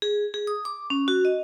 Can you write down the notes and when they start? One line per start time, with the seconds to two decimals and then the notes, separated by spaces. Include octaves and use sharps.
0.02 G#4
0.34 G#4
0.47 D#6
0.65 D6
0.90 C#4
1.08 F#4
1.25 D#5